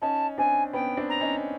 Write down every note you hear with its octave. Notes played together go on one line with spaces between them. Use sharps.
C#4 D#4 A5
C4 D4 G#5
B3 C#4 G5
C4 D4
A#5
C#4 D#4